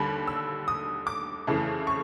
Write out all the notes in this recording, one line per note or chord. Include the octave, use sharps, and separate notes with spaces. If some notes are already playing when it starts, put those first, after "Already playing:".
Already playing: D#2 D3 G3 B5
E6
D#6
D6
F2 C#3 E3 A3
C#6